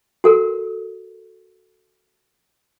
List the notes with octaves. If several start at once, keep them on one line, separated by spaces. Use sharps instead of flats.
F#4 A4 A#4